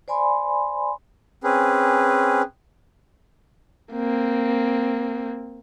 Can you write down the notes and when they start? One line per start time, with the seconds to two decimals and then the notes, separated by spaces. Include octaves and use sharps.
0.08 C5 D5 G#5 B5 C6
1.44 C4 C#4 G#4 B4
3.92 A#3 C4